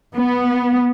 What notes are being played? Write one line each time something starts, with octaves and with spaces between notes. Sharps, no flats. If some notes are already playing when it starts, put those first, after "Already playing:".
B3